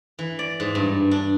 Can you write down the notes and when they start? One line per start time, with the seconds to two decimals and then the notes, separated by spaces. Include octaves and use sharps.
0.19 E3
0.39 D5
0.60 G#2
0.75 G2
1.11 D4